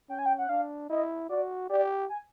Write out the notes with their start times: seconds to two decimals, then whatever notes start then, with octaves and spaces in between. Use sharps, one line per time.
0.09 C#4 G5
0.19 G#5
0.26 G5
0.38 F#5
0.49 D4 F5
0.90 E4 D#5
1.29 F#4 D5
1.69 G4 D5
2.09 G#5